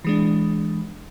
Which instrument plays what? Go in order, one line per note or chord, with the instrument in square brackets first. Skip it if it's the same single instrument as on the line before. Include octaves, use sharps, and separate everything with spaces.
[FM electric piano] E3 G#3 D4